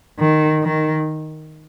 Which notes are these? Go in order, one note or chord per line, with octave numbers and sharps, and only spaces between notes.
D#3
D#3